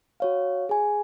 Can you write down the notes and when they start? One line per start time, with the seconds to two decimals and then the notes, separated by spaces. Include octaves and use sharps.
0.20 F#4 C#5 F5
0.69 G#4 G#5